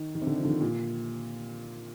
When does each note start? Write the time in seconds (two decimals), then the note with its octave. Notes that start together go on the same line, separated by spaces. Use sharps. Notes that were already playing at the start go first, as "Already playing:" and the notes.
Already playing: D#3
0.15 D#3
0.22 C3
0.27 D3
0.38 F3
0.45 D3
0.50 D#3
0.61 A#2